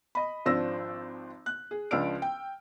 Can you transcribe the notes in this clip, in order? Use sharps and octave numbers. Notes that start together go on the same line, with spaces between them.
D#5 B5
G#1 F3 C4 D4 E6 A#6
F#6
G#4
C#2 F3 D4 E6 F6 D7
G5